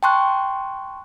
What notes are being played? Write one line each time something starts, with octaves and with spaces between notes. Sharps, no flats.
G5 A5 C6 C#6 F#6